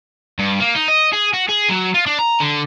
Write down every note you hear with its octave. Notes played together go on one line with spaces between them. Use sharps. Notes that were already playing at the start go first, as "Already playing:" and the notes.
G2
A#3
D#4
D#5
G#4
F#4
G#4
F#3
F4
D4
A#5
D3